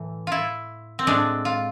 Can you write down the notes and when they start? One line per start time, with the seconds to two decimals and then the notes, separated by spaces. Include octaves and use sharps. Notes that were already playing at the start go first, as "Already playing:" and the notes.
Already playing: A2 E3
0.27 E4 F4
0.99 C4
1.07 A2 G#3 D4
1.45 F4